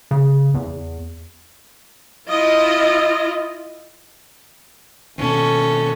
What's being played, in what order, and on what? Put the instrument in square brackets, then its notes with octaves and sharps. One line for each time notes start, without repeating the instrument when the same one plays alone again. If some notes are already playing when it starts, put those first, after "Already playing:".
[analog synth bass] C#3
E2
[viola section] E4 F4 D#5
[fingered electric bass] D#2 B2 [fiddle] C#4 A4